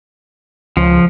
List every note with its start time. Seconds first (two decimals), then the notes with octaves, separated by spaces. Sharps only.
0.77 C#2 F3